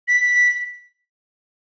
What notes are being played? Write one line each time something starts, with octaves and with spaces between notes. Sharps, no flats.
B6